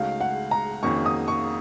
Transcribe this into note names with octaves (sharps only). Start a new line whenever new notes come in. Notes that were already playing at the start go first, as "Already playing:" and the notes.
Already playing: C#2 C#3 A3 D#4 F#4 F5
F#5
A#5
F2 D#3 A#3 C#4 F#4 C#6
D#6
C#6